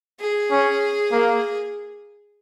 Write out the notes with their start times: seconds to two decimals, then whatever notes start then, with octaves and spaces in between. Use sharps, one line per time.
0.20 G#4
0.51 C#4
1.12 A#3